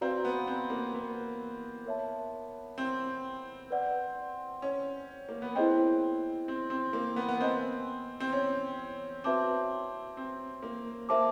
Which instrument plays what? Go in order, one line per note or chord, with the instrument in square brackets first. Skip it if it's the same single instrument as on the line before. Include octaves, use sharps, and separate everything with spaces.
[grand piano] C4 [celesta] F#4 B4 D5 F5 A#5
[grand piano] B3
C4
A#3
B3
[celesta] A#4 C#5 E5 A5
[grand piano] C4
[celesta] B4 D5 F#5
[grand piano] C#4
A#3
B3
[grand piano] C4 [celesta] E4 G#4 C5 D#5 G5
[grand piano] C4
C4
A#3
B3
B3
[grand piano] C4 [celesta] C5 D#5 G#5 C6
[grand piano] C4
C#4
[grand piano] C4 [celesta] F#4 B4 E5 A5 D6
[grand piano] C4
A#3
[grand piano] A#3 [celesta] C5 E5 A5 D6